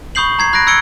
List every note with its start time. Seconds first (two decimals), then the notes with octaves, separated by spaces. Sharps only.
0.15 B5 C#6 D#6 G6 C7 F#7
0.39 A#5 G#6 C7
0.53 B5 F#6 G#6 A#6 D7
0.67 B5 E6 G#6 C#7 D7 G7